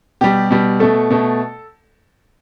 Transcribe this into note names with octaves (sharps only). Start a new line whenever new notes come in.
B2 G3 G4
B2 G3
B2 A3 A4
B2 A3